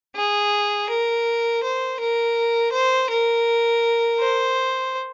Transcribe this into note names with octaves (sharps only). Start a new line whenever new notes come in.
G#4
A#4
C5
A#4
C5
A#4
C5